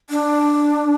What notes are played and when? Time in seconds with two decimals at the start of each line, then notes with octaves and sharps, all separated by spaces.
0.10 D4